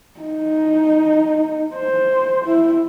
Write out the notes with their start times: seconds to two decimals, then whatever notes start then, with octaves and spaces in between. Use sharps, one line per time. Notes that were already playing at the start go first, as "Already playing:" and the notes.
0.21 D#4
1.75 C5
2.45 E4